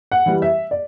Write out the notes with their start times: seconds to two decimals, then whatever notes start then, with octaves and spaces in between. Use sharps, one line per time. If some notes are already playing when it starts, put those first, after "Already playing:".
0.12 F#5
0.26 E3 G3
0.42 E5
0.71 D5